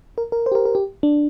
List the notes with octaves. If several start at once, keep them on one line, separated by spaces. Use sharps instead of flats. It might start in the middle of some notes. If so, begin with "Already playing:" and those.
A#4
A#4
C5
G4
A#4
A#4
G4
D4